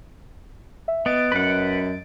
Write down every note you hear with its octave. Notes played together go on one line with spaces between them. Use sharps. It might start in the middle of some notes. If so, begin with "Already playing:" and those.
E5
B3 D#5 A6 D7
F#2 B4 F#5